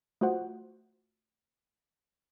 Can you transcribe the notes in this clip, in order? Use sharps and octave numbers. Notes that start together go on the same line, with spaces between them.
A3 F4 F#4 C5 F#5